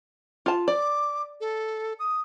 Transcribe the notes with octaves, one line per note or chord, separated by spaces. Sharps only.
F4 A5
D5 D6
A4
D#6